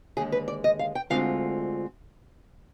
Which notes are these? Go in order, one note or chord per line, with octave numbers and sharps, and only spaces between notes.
D#2 D3 G#3 G#4
B4
D5
D#5
F5
G5
D2 D3 G#3 C4 F4 F5